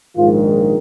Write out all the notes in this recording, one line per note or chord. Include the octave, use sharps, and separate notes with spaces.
A#1 G#2 D#3 F4